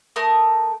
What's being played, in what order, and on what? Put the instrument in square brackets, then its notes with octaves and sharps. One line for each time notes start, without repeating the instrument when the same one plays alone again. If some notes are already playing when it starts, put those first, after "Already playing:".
[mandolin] A3 A#4 D#6